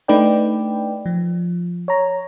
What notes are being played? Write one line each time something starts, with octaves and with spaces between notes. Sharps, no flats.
A3 D4 D#4 B4 D5 G5
F3
C#5 A#5